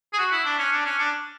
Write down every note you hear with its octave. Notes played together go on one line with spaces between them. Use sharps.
G#4
F#4
E4
D4
C#4
D4
C#4
D4